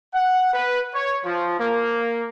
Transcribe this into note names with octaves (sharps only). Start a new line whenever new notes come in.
F#5
B4
C#5
F3
A#3